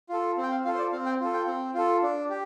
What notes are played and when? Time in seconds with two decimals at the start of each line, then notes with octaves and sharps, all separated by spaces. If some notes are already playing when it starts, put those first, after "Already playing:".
0.09 F4 A4
0.37 C4
0.43 G5
0.51 F5
0.65 F4 F5
0.68 A4
0.74 C5
0.78 D5
0.92 C4 F5
1.06 G5
1.20 F4 A4
1.34 G5
1.47 C4
1.74 F4 A4
2.02 D4
2.30 G4